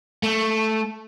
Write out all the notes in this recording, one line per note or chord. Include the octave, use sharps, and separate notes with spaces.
A3